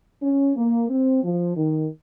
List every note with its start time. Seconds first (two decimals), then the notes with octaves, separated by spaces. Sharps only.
0.21 C#4
0.56 A#3
0.89 C4
1.24 F3
1.56 D#3